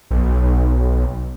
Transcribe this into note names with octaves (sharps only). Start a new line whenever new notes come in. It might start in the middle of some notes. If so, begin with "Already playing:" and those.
B1